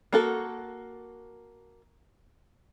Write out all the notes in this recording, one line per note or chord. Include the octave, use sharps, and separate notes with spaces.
A#3 F#4 A4